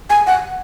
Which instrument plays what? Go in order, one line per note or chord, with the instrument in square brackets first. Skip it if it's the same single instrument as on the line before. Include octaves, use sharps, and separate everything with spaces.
[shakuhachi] G#5
F#5